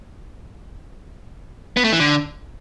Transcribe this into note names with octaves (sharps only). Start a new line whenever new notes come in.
B3
A3
E3
D3